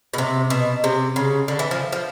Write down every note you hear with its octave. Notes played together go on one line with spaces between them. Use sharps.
B2
C3
B2
C3
C#3
D3
E3
F3
F3